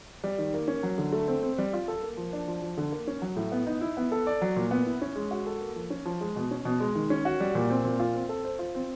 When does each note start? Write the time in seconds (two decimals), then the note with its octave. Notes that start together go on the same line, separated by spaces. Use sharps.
0.24 G3
0.38 D#3
0.54 A#3
0.68 C#4
0.83 F#3
0.98 D3
1.12 A3
1.28 C4
1.43 C4
1.58 G3
1.73 F4
1.88 A4
2.02 A#3
2.17 F3
2.33 D4
2.48 F3
2.62 F3
2.77 D3
2.92 A#3
3.07 C#4
3.22 F#3
3.37 A2
3.52 B3
3.67 D#4
3.81 E4
3.97 B3
4.12 A4
4.27 D5
4.42 F#3
4.56 A#2
4.71 B3
4.86 E4
5.01 C#4
5.16 G#3
5.31 F#4
5.46 A4
5.61 A#3
5.76 F3
5.90 C#4
6.05 F3
6.21 G#3
6.36 B2
6.51 C#4
6.65 B2
6.80 G#3
6.95 D#3
7.10 C#4
7.25 F#4
7.40 G3
7.55 A#2
7.70 C4
7.85 A#2
8.00 F4
8.15 C4
8.29 A4
8.45 C5
8.59 F4
8.75 C4